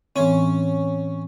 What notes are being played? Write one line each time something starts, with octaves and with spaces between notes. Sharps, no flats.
A2 E3 C4 C#4